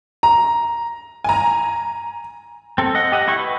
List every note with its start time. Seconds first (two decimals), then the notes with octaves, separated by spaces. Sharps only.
0.23 A#5
1.24 G#5 A#5
2.78 C4 A4
2.95 D#5 F#5
3.12 G4 D#5 F#5
3.28 E4 G4 C#6
3.39 B4